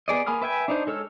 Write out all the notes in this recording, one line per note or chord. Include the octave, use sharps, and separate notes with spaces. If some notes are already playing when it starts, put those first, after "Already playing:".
B3 G#4 D5 D#5
A#3 G#5 B5 D#6 F6
B4 E5 G5 G#5
D4 D#4 C5
G#3 A4 C#5 E6 F6